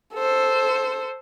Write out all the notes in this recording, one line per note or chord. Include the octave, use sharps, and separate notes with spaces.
A4 C5